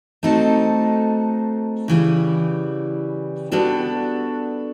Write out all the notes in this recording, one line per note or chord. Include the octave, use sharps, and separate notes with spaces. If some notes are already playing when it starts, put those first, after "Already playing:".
A3 C4 D#4 F#4 A4
C#3 E3 G3
G3 B3 D4 F#4 A4